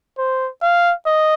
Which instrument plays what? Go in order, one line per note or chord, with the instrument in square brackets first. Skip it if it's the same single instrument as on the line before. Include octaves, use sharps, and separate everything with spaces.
[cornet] C5
F5
D#5